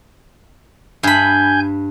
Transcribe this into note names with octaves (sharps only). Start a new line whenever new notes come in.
G2 G#5 B5 G6